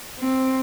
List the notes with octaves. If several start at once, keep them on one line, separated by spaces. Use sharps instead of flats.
C4